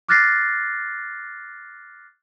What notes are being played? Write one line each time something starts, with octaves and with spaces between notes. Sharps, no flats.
D6 F6 F#6 A6 A#6 C7